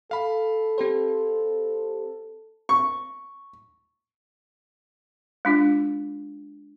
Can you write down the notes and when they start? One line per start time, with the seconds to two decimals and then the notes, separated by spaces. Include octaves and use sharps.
0.11 A4 F5 B5
0.78 C4 G4 C5
2.69 C#6
5.45 G#3 D4 F4